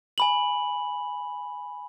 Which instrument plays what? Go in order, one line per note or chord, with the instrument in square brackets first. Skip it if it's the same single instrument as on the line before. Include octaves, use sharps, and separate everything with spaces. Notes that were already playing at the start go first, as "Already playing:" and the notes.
[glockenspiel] G#5 B5 F#7